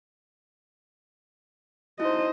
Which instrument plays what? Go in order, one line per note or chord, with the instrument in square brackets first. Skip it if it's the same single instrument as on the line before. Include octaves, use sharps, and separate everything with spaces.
[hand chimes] D#4 E4 F#4 [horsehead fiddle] C5 D#5